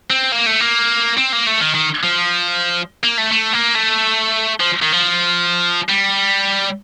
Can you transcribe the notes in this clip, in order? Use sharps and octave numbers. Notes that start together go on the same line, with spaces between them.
C4
A#3
A3
A#3
C4
A#3
A3
D#3
D#3
F3
A#3
A3
A3
A#3
A3
F3
D#3
F3
G3